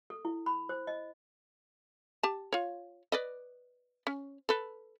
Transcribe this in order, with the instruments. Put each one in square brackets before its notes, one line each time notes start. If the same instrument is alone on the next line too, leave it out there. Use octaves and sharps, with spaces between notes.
[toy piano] A4
E4
B5
C5
D#5
[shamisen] G4 A5
F4 C#5
B4 D5 D#5
C#4
A4 B4